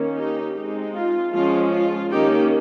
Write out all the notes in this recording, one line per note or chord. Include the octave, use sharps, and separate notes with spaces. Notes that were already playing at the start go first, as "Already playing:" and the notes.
Already playing: D#3 A#3 C#4
D#4 G4
G#3 C4 D#4
F4
F3 G#3 C#4 F4
F4
D#3 A#3 C#4 D#4 G4